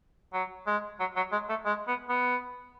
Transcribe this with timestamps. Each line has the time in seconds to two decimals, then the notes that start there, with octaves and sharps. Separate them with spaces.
0.33 F#3
0.66 G#3
1.00 F#3
1.16 F#3
1.32 G#3
1.49 A3
1.65 G#3
1.87 B3
2.09 B3